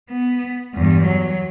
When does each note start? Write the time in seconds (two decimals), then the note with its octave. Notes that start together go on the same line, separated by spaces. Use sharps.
0.10 B3
0.75 E2 G2
1.06 F#3